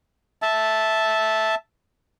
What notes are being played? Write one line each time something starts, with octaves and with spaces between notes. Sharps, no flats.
E5 A5